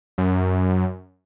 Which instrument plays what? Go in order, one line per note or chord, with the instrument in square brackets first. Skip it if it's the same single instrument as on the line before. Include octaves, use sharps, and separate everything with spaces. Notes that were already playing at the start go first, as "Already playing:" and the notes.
[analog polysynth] F#2